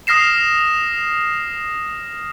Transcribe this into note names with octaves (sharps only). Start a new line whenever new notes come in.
D#6 F6 A#6 C7 E7